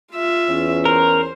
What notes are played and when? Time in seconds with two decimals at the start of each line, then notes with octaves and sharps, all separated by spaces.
0.13 F4 E5
0.48 E2 C#4
0.85 A#4 C5